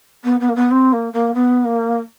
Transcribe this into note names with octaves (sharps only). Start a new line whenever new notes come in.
B3
B3
A#3
B3
C4
A#3
A#3
B3
A#3